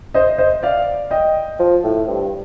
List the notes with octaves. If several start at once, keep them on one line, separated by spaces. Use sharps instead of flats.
C5 D#5
C5 D#5
D5 F5
D#5 G5
F3
A2
G2